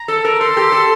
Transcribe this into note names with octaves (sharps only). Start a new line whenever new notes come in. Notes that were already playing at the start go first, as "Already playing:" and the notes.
Already playing: A#5
A4
A#4
A4 C6
G4
A4